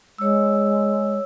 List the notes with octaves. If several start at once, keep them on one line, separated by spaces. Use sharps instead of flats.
G#3 C#5 E6